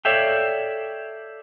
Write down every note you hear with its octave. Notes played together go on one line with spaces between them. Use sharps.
A4 C#5 D5 E5 F5 G5